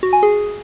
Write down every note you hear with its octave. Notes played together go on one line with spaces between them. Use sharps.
F#4
G#5
G#4